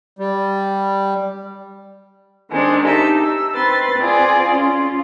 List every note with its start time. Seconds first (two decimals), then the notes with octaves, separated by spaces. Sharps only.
0.19 G3
2.49 D#3 G#3 C4 D4
2.84 D#4 G4 E5 A5
3.18 E6
3.55 C4 B4 C6 A6
3.97 C4 F4 G#4 D5
4.51 C#4 F4